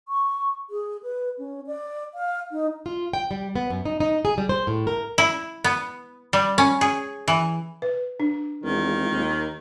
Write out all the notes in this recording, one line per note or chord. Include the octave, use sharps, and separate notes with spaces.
C#6
G#4
B4
C#4
D5
F5
D#4
F4
G5
G3
B3
F#2
D#4
D#4
G#4
G3
C5
A2
A#4
E4
B3
G3
C#4
G#4
E3
B4
D4
E2 D#3 G#3 C4 F4
D#2